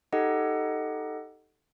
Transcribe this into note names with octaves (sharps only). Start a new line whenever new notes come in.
D#4 G4 A4 D#5 F#5